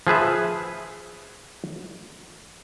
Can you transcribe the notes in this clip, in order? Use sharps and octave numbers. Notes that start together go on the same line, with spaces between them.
F3 G#4 B4 E5